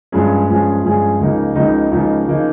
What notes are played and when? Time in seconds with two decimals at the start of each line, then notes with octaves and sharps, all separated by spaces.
0.12 G2 F3 G#3 C#4 G#4
0.48 G2 F3 G#3 C#4 G#4
0.84 G2 F3 G#3 C#4 G#4
1.19 C#2 C#3 F3 A#3 D#4
1.55 C#2 C#3 F3 A#3 D#4
1.91 C#2 C#3 F3 A#3 D#4
2.27 C#3 F3 A#3 D#4